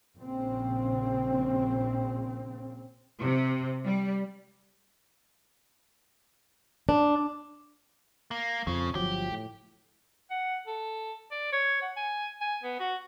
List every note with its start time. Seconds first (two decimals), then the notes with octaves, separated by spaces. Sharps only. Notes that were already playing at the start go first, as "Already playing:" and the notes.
0.17 A#1 C#3 C4
3.20 C3
3.84 G3
6.89 D4
8.31 A#3
8.67 F2 C#3 F3
8.95 G1 F3 F#3 G4
9.31 A2
10.31 F#5
10.67 A4
11.32 D5
11.53 C#5
11.82 F#5
11.97 G#5
12.41 G#5
12.64 B3
12.80 F#4